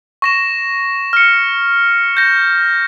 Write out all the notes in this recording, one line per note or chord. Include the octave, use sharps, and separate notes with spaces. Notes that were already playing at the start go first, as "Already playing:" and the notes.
C#6 A#6 E7
F6 C#7
G6 A#6